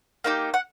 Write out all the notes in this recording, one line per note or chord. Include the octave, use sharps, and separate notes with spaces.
A#3 D#4 G4
F#5